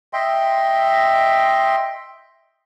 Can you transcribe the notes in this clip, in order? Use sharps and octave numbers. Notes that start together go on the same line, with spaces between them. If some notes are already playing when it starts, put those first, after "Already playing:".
D#5 E5 G5 C6